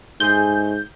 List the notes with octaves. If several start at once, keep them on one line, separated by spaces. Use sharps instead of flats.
G#2 G#3 A3 G#4 G6